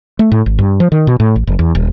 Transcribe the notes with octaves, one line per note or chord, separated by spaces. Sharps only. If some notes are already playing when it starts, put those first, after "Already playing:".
A3
A2
G#1
G2
F3
D#3
B2
A2
A1
F#1
E2
D#1